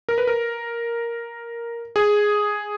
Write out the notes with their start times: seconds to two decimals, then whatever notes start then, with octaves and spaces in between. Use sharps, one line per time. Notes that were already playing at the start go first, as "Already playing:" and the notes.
0.09 A#4
0.18 B4
0.27 A#4
1.96 G#4